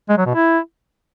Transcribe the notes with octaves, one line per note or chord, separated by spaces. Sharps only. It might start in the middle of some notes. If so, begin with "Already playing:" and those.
G#3
F#3
B2
E4